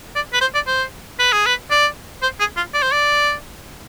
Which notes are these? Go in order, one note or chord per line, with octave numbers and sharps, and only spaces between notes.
D5
B4
C5
D5
C5
B4
G#4
B4
D5
C5
G#4
F4
D5
C5
D5